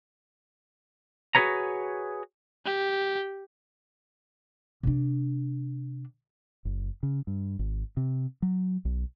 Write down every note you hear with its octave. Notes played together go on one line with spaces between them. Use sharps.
F#4 G#4 A4 B4 C#5 A#5
G4
C3 D4
F#1
C#3
G2
G#1
C3
F#3
B1